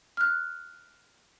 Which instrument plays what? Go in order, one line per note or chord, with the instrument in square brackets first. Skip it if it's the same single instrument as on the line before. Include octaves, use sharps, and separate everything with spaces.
[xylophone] F6 F#6